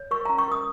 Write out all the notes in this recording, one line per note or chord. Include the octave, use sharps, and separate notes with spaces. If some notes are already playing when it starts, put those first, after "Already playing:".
Already playing: C#5
A#4 C#6
A#5
C#4
C#6
A#4 D#6